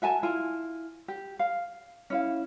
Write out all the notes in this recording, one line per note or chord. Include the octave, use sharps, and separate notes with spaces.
F#4 E5 G#5 A5
E4 F4 G#5
G4
F5
C#4 E4 F5